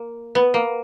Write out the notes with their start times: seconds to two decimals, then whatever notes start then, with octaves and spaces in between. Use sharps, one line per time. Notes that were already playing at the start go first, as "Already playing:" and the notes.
Already playing: A#3
0.35 B3
0.54 A#3